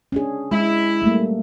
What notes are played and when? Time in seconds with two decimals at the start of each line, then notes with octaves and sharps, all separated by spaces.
0.12 C#4 D4 G#4
0.51 G#3 E4
1.02 G3 A3 A#3